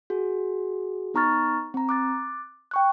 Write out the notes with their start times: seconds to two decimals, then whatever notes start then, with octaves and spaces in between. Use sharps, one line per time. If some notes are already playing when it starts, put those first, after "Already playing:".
0.10 F#4 G#4
1.14 B3 D#4 A#5 C#6 F6 A6
1.74 C4 A#5
1.89 D6 F#6 A6
2.71 G5 C#6 F#6